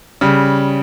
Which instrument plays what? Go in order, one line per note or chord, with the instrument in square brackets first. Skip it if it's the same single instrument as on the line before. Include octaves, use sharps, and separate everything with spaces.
[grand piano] C#3 G3